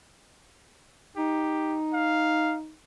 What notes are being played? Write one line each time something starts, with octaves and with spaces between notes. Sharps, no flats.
D#4 G4
F5